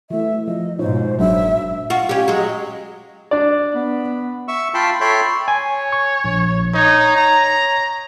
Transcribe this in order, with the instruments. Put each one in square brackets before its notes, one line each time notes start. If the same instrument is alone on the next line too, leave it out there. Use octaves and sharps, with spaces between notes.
[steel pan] E3 A3 [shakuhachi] E5
[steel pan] F3 [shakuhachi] D#5
[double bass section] G#2 B2 [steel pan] D#4 F4 C#5 [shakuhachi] C5
[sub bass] F#1 [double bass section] A#2 [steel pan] F#3 G#3 D4 [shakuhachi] E5
[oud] F4 F#4
C#4 G4
F#3 G#3
[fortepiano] D4 D5
[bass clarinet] B3
[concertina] E5 C#6 E6
F4 G5 A5 B5 C6
A4 C#5 E5 G5 B5 C6
[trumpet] C#5 [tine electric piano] G#5
[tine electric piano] C#6
A#1
[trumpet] D#4 [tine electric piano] C#5 G#6
[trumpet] A#5